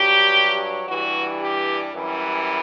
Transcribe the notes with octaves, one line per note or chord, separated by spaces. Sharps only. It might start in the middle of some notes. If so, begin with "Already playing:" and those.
Already playing: G2 F#3 G4
G2 E3 G3 F#4
G4
F#2 E3 G3